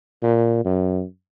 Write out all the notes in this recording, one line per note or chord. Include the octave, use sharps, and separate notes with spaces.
A#2
F#2